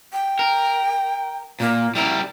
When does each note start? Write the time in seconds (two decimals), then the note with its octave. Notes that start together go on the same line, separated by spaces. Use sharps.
0.13 G5
0.39 A#4
1.60 A#2 A#3
1.95 G3 E4 A#4